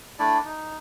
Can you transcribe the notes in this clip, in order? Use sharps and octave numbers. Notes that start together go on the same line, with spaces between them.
A3 D4 E4 D5
D#4